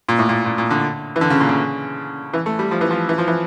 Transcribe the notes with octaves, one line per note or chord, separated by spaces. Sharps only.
A#2
A2
A#2
A#2
A#2
D3
E3
D3
C#3
A#2
C#3
E3
A3
G3
F3
E3
F3
E3
F3
E3